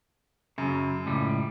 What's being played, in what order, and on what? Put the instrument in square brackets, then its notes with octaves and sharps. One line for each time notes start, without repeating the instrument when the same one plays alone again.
[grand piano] F#2 [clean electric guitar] C#3 F#3
[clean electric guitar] C#2 A2 G3